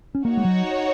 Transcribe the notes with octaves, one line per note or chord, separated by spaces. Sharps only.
C#4
A#3 D#4 F#4 C#5
G#3
F#3